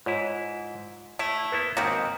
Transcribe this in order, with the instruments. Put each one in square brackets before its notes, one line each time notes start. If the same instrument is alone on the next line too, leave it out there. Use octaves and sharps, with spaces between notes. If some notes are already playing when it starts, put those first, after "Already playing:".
[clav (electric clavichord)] G#2 E4 [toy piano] F4 C#5
[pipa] A3 [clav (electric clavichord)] E4
[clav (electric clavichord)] A#3 B3 E4 [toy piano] B4
[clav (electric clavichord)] G#2 C4 F#4 [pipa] D#3 A#3 [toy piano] C#6 D#6